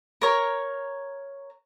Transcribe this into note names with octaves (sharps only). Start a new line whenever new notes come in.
A#4 C#5